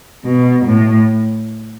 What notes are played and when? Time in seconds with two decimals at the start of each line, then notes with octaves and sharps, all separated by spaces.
0.25 B2
0.66 A2